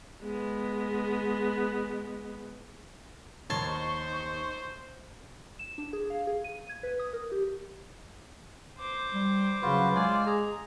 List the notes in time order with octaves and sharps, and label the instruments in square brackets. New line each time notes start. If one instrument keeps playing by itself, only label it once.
[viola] G#3 B3
[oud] D#2 [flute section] D#4 C#6 [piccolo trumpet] C5 [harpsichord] C#5 A5 C6
[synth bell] E7
D4
G#4
F5
G#4
D#7
G#6
B4
D#6
A#4
G4
[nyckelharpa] C5 D6
[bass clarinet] G3
[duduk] C#3 [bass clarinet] F#3 [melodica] F4 F#4 B4
[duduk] G#3 [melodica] F4 D5 G#5
[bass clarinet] G#4 [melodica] A#5